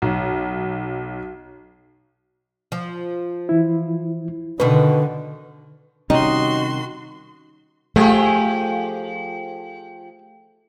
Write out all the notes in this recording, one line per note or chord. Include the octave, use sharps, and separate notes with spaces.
B1
F3
E3 E4
B2 D3 D#3 B4
C3 D#3 G3 C#4 D#4 F#4 C6
F3 A3 G4 G#4